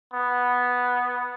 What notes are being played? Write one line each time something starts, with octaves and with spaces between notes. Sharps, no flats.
B3